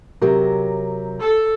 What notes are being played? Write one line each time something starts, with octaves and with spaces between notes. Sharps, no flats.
C3 F#3 G4 A#4
A4